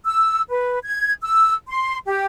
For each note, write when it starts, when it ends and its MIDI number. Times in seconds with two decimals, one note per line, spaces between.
0.05 0.41 88
0.50 0.78 71
0.83 1.12 92
1.22 1.52 88
1.68 1.97 84
2.06 2.26 67